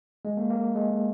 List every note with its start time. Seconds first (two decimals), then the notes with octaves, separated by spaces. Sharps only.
0.25 G#3
0.37 A#3
0.50 A#3
0.75 G#3